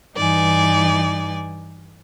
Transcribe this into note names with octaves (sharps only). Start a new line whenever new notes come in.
G2 E3 D#4 D5 G#5